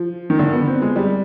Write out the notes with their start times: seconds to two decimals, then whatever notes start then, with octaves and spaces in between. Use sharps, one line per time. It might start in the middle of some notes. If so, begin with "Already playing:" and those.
Already playing: F3
0.30 D#3
0.39 D3
0.53 B3
0.67 C4
0.82 G#3
0.96 G3